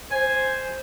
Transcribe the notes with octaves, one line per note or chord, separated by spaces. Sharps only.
C5 G#5